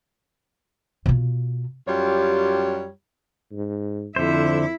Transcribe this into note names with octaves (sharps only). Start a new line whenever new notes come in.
B2 F4
F#2 G3 F4 G4 C#5
G#2
F2 D3 E4 C5 E5